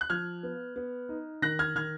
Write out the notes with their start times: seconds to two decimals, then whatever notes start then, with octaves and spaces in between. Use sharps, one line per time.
0.01 F#6
0.10 F3 F6 G#6
0.43 B3
0.76 B3
1.09 D#4
1.42 D#3 F#6 A#6
1.59 F6 G#6
1.75 D#3 F6 G#6